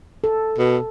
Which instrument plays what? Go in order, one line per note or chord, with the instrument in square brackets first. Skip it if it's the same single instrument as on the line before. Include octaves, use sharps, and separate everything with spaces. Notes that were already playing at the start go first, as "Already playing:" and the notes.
[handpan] A4
[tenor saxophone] B2